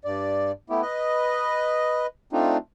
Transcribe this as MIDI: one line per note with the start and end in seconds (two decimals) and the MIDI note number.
0.05 0.52 43
0.05 0.52 74
0.70 0.81 57
0.70 0.81 59
0.70 0.81 64
0.70 0.81 67
0.82 2.06 71
0.82 2.06 75
2.33 2.57 57
2.33 2.57 60
2.33 2.57 62
2.33 2.57 63
2.33 2.57 65